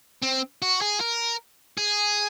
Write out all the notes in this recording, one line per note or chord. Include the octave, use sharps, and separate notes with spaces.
C4
F#4
G#4
A#4
G#4